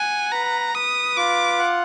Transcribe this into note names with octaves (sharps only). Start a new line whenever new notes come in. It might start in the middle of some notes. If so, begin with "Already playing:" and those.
Already playing: F#5 G#5
B4 A#5
B4 D#6
F4 D6
F#5